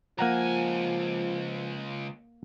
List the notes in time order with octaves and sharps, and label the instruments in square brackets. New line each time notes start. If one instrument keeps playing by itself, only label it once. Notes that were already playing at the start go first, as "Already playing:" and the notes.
[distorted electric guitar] C#2 G#5 [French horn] F3 [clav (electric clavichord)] A#3 F#5 A#5